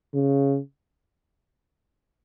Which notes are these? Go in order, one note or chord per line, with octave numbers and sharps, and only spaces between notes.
C#3